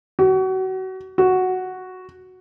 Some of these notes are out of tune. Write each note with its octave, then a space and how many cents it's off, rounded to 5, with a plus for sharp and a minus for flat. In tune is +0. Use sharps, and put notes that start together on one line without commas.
F#4 +30
F#4 +0